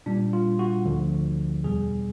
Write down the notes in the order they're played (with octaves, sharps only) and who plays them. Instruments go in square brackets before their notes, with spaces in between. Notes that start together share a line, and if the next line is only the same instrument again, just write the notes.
[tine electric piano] A#2 G3 D4
F4
F#4
D2 D3 F3
E2 B2 G3 G#4